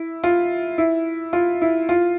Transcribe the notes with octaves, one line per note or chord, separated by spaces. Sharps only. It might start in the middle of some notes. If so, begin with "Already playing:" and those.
Already playing: E4
F4
E4
F4
E4
F4